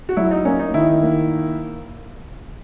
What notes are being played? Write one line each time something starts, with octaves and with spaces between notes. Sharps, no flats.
F#4
F#3 E4
D#4
A#3 C#4
D#4
D#3 E4
A#3